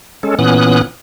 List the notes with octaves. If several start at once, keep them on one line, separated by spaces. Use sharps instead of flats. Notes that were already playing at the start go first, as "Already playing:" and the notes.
G#3 C#4 A4
A#2 E3 B3 C#4 D#6 F#6